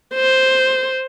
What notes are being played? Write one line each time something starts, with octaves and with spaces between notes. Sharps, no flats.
C5